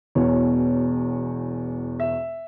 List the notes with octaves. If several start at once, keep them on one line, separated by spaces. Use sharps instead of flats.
E1 E2 B2 C#5
E5